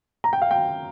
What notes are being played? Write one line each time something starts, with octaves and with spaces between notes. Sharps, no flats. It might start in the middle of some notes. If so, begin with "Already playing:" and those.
A#5
G5
F5
G5